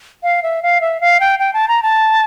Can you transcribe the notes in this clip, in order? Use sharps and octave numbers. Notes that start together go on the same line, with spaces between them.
F5
E5
F5
E5
F5
G5
G5
A5
A#5
A5